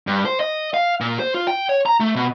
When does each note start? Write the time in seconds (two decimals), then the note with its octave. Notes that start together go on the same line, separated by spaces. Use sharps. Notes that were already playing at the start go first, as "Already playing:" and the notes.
0.07 G2
0.25 C5
0.40 D#5
0.74 F5
1.01 A#2
1.20 C5
1.34 F4
1.47 G5
1.69 C#5
1.86 A#5
2.00 A3
2.16 B2